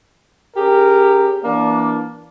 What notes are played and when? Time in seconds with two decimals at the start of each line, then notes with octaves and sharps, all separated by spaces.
0.56 C#4 G4 G#4 A#4
1.43 E3 A#3 D4